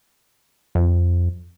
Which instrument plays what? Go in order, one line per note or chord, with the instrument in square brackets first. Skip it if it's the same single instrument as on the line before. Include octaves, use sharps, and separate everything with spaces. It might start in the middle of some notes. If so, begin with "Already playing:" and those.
[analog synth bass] F2